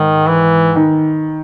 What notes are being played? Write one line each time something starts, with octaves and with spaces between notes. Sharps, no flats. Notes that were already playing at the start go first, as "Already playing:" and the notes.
Already playing: G#2 D#3
E3
D#3